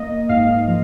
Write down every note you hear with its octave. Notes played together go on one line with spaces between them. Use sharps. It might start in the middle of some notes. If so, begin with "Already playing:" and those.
Already playing: A#3 D#5
G#2 F5
F3